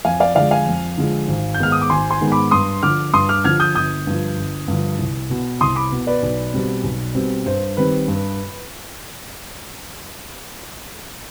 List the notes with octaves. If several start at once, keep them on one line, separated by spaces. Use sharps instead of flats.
F2 F5 G#5
D5 F5
D3 F3 G#3 D5 F5
F5 G#5
F2
D3 F3 G#3
G#1
G6
G#2 D#3 G#3 B3 F6
D#6
D6
G#1 G#5 C6
G#5 C6
G#2 D#3 G#3 B3
B5 D6
G2 C6 D#6
D3 F3 D6 F6
G2 C6 D#6
D6 F6
D3 F3 F6 G#6
D#6 G6
G1 D#6 G6
G2 D3 F3
G1
G2 D3 F3
C2
B2 B3
C2 C6 D#6
B5 D6
B2 B3
B4 D5
B1
B2 G3 C4
B1
B2 G3 C4
G2 C5
D#3 G3 C4 B4
G2